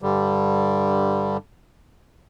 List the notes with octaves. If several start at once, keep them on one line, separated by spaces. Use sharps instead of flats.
G2 D3 G3